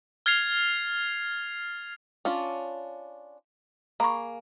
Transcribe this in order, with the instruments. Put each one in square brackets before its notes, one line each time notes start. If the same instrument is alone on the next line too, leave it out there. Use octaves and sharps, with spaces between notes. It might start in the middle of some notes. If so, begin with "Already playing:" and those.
[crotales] F6 G#6 A6 C7 F7
[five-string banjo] C#4 D4 F4
[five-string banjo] A#3 G#4 [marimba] A#5 B5 C#6